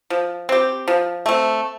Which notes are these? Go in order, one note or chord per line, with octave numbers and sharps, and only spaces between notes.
F3
C4 G4
F3
A3 C4